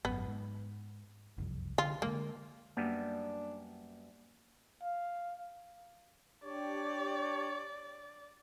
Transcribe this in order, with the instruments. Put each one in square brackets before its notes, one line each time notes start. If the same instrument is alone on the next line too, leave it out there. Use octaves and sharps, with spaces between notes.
[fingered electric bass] G#1 F#2 [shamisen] B3
[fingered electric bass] G#2
F#1 C2 F2
[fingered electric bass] D3 [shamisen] F4
[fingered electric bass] D3 D#3 G#3 [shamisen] A#3
[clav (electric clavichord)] F#2 G3 B3 [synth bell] A#3 [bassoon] D4
[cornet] F5
[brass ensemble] D4 G4 C#5 [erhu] D5